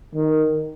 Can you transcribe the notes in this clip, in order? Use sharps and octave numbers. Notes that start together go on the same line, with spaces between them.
D#3